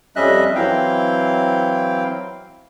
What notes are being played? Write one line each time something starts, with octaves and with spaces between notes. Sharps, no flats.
F2 G3 C#4 D#5 E5 F#6
E3 F#3 C4 E4 F5 G5